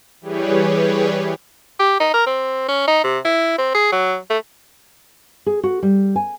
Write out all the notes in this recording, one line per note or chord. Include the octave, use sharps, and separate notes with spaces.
E3 G3 G4 G#4 B4 C#5
G4
D#4
A#4
C4
C#4
D#4
C3
E4
C4
G#4
F#3
A3
G#4
F#4
G3
G#5